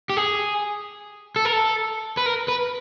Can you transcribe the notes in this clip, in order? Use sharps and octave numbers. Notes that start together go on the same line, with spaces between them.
G4
G#4
A4
A#4
A4
B4
A#4
B4